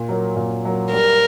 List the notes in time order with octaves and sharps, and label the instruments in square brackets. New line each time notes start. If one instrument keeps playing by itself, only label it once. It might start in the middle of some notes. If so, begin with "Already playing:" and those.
Already playing: [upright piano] A#2
F#3 A#3
A#2
F#3 A#3
[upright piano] G3 [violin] A#4